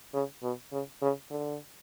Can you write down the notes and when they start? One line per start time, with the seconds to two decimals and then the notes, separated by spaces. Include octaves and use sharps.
0.14 C#3
0.43 B2
0.72 C#3
1.02 C#3
1.31 D3